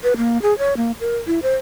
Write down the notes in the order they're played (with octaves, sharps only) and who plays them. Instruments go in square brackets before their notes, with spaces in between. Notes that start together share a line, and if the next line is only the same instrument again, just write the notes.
[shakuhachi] B4
A#3
G#4
C#5
A#3
A#4
E4
C5